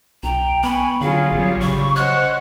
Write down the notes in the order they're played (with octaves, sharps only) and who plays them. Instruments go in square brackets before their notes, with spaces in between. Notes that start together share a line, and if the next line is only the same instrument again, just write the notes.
[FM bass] B1 [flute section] G5 [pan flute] A#5
[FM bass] B3 [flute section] G#5 C#6 [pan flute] B5
[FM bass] D3 [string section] F#3 C#4 [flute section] F4 G#4 [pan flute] F5
[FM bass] A1 [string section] F#3 G3
[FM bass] C#3 [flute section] B5 [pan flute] C#6
[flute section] C#4 D#5 F#5 [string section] C5 C#5 [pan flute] F#6